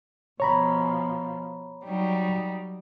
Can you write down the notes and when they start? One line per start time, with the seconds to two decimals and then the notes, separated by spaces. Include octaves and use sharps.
0.40 B2 F3 C#5 A#5 B5
1.85 F#3 G3 D#4